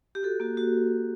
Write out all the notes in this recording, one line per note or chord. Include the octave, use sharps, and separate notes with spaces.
G4
F#4 A4
A#3 F#4
F#4